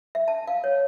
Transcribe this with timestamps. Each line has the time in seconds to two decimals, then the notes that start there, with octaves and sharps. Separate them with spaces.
0.15 E5
0.28 A5
0.47 F5
0.64 C#5